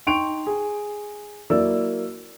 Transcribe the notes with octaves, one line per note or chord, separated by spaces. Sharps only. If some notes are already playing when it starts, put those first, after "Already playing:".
D#4 G5 C6 C#6 D7 F7
G#4
F#3 A#3 E4 D5 E6